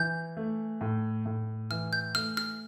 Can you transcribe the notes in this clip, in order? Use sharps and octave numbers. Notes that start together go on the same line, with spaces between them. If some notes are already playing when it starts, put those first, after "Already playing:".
Already playing: E3 G6
A3
A2
A2
E3 F6
G6
A3 F6
F6